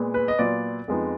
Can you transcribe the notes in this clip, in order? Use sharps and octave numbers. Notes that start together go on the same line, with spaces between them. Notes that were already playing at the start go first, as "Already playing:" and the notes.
Already playing: A#2 G#3 B3
B4
D#5
A#2 F#3 B3 F4 D5
F2 F3 G#3 B3 D#4